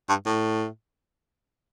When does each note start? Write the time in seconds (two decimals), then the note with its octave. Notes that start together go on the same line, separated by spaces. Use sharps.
0.09 G2
0.26 A2